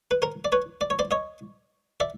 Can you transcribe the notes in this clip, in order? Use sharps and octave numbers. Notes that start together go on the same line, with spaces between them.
B4
A#4 C5
D5
B4 C#5
D5
C#5
C5 D5
C#5 D#5
D5 E5